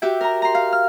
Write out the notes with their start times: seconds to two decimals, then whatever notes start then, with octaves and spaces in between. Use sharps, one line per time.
0.02 F#4 G4 E5 G5
0.21 A#4 A#5
0.42 A#5 C6
0.55 F5
0.73 F6